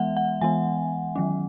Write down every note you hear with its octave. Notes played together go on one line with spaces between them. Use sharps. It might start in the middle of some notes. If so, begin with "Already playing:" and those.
Already playing: E3 G#3 B3 E5 F#5
F#5
E3 G#3 B3 G#5
D#3 F#3 C#4